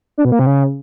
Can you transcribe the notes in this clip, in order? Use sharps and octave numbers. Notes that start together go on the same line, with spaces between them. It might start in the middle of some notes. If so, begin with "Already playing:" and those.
D4
B2
A#3
C3
C#3